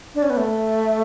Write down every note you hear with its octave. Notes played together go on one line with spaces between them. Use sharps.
D4
C#4
B3
A3